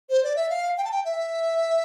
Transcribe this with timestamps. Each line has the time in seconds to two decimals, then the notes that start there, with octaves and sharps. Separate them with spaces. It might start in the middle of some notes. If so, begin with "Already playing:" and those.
0.10 C5
0.23 D5
0.36 E5
0.50 F5
0.78 G5
0.84 A5
0.91 G5
1.05 E5